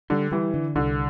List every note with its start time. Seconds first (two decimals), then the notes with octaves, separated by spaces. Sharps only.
0.10 D3 G3
0.32 E3 G3
0.54 D3
0.75 C2 D3